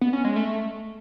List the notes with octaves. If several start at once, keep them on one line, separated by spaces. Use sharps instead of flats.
B3
C#4
G#3
A3